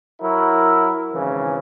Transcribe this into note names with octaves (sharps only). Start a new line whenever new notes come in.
F#3 E4 A#4
G#1 C#3 E3